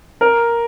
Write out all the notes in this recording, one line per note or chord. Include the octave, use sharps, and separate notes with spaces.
A#4